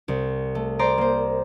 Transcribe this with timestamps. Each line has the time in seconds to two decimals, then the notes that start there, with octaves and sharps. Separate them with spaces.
0.08 C2
0.55 A3
0.79 C5 D5 A#5 C6
0.98 A#3 C5